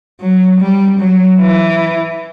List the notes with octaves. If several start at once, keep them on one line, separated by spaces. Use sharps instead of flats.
F#3
G3
F#3
E3